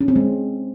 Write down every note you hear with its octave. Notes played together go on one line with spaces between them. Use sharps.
C#4
C4
G#3